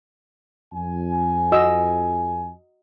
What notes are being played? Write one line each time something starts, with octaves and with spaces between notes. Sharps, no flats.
F2 G#5
F#4 D#5 E6